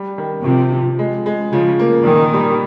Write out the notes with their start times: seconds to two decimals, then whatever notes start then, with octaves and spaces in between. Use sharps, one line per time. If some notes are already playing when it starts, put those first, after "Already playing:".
Already playing: G3
0.18 D#3
0.45 C3 F3
0.72 F3
0.99 G#3
1.26 G#3
1.52 C#3 F3
1.79 A#3
2.06 A#2 D#3
2.33 G3